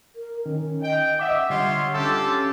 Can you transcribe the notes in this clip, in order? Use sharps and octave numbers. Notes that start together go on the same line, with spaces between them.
A#4
D#3 C#4
D#5 G5
D#5 E5 F#5 D6
D3 G3 F4 C#5 C6
C#4 D4 F4 G4 A4 E6